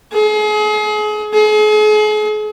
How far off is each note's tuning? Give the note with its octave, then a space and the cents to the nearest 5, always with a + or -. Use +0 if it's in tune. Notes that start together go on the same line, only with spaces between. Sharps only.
G#4 +35
G#4 +40